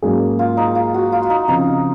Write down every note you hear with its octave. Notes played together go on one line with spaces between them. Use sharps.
G#2 F#3 A#3 C#4 G#4
F4
D#4
F4
F#4
F4
D#4
C#3 F3 C4 D#4